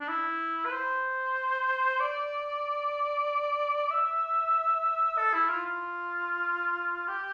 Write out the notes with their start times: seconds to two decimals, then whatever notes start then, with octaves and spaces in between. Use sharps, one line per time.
0.01 D4
0.08 E4
0.65 B4
0.72 C5
2.00 D5
3.90 E5
5.18 A4
5.34 E4
5.49 F4
5.66 F4
7.08 G4